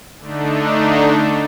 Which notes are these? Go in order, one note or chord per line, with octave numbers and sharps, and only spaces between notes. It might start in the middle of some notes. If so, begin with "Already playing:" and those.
D3 A3 D4 D#4